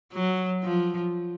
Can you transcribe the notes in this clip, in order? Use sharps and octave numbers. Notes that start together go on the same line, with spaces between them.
F#3
F3